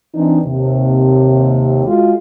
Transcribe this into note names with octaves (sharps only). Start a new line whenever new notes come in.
E3 C4 D4 D#4
D#2 C3
G#3 F4 F#4 G#4